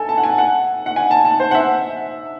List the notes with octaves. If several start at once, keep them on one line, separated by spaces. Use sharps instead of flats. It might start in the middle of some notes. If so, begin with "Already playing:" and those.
Already playing: A4 G#5
A5
F#5
G#5
F#5
F#5
G#5
A5
A5
C5
F#5
E5